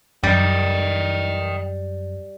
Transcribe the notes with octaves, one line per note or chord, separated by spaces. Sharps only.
F#2 G3 D#5 G5